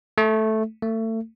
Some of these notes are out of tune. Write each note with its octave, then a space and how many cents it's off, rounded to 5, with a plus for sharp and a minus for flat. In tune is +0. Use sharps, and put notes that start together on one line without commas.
A3 -5
A3 +30